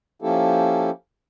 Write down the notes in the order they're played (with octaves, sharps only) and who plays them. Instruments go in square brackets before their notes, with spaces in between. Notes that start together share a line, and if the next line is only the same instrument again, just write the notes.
[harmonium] F3 A#3 C#4 E4 G4 A4